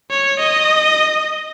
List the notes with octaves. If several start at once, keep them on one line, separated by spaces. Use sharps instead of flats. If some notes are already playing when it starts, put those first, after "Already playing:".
C#5
D#5